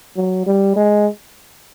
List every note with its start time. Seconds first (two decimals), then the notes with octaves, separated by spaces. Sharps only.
0.17 F#3
0.47 G3
0.76 G#3